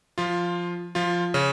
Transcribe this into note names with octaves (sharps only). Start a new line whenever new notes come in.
F3 F4
F3 F4
C#3 C#4